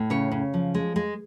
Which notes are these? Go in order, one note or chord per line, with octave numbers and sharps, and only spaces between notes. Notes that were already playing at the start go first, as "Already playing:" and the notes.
Already playing: A2
C#3 C#5
C#3
F3
G#3
G#3